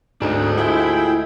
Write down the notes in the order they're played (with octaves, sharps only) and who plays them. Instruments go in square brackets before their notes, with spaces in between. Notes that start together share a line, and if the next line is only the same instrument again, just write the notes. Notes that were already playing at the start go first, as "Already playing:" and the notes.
[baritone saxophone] D2 [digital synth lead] G#2 [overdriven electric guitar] D4 D#5
[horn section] G#3 F4 G#4 [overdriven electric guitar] E4 E5 [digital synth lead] G5